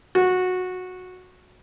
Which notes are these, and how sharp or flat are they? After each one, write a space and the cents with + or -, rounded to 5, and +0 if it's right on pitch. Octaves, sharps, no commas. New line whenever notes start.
F#4 -15